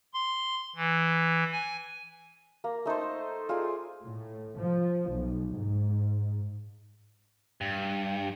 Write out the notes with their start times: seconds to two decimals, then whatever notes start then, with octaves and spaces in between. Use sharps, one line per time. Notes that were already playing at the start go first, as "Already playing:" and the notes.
0.14 C6
0.76 E3
1.52 G#5
2.64 A#3
2.86 A3 D#4 A4 C5
3.49 F4 G#4 D5 G#5
4.02 A2
4.56 F3
5.09 B1
5.56 G#2
7.61 G2